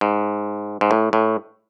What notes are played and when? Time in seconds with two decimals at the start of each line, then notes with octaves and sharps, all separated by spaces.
0.01 G#2
0.81 G#2
0.91 A2
1.13 A2